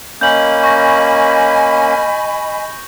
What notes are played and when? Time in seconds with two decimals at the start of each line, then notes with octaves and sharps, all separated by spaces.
0.21 A#3 C#4 D#5 G#5 B5 G6 F#7
0.64 C#6 A#6